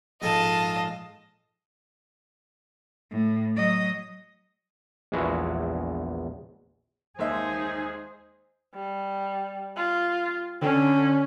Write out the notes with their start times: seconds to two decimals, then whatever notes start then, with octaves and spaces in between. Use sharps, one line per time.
0.22 A#1 G#2 F4 A4 D#5 A5
3.11 A2
3.56 F#3 D#5
5.12 A#1 E2 G#3 B3 E4 F#4
7.19 D#2 G#3 D#4 G#4 C5 E5
8.74 G3
9.76 F4
10.61 D3 C#4